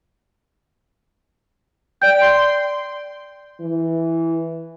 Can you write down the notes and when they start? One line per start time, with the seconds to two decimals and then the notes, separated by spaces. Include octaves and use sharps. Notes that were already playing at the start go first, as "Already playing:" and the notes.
2.02 D5 G5 G6
2.21 C6
3.61 E3